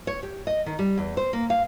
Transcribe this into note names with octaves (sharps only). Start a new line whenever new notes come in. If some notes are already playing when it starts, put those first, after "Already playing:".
C#5
G4
D#5
D#3
G3
E2
C5
A#3
F5